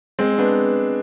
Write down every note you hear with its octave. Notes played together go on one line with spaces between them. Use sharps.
G#3 C4
B3 D4